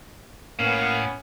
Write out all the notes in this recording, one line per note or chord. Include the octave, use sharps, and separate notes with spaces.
A2 A#3 B3 C#4 F5